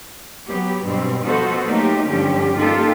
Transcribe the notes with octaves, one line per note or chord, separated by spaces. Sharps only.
F#3 B3 G4
G2 B2 C4
F3 B3 F#4 A4 C5 D#5
F#3 A3 A#3 D#4 G4
G2 D3 F3 C#4 G4
A#3 D#4 F4 G4 A4